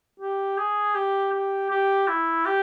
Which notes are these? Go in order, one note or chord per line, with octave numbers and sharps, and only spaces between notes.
G4
G#4
G4
G4
G4
E4
G4